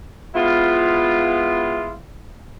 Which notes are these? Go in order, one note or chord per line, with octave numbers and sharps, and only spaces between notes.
G#3 B3 E4 F4